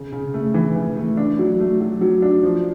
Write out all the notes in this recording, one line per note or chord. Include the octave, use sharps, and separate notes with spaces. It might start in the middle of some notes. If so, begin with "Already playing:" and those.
Already playing: C#3
C#3
A3
E3
E3
A3
D4
F#3
A3
F#3
F#3
D4
F3